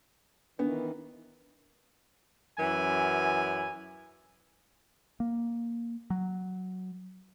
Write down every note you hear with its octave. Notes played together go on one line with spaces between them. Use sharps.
D#3 E3 B3 D4
F#2 E3 G#5
A#3
F#3